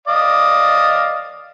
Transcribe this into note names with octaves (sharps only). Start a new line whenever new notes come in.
D5 D#5 F5